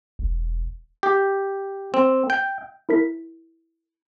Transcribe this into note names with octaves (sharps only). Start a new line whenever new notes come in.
E1
G4
C4
G5
E4 A#4 B6